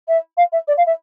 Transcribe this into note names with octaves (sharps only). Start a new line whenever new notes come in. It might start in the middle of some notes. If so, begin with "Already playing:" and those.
E5
F5
E5
D5
F5
E5